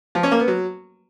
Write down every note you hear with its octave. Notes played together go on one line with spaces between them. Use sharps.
F3
C#4
A#3
B3
F#3